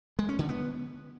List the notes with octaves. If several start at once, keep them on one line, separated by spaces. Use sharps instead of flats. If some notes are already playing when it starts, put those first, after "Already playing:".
G#3
C#4
D3
B3